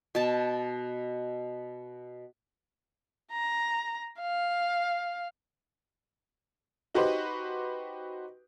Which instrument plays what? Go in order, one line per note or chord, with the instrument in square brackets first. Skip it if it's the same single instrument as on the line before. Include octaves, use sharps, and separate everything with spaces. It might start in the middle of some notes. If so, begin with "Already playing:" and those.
[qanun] B2 A5
[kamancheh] A#5
F5
[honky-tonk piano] D#4 F#4 G4 B4 C5